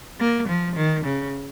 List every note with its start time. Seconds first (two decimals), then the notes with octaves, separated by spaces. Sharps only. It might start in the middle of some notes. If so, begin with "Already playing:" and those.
0.20 A#3
0.48 F3
0.76 D#3
1.05 C#3